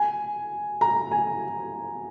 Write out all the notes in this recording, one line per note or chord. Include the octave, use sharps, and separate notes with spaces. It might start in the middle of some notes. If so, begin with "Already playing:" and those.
Already playing: G#5
A#5
G#5